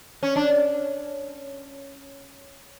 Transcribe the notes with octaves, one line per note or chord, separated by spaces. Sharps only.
C#4
D4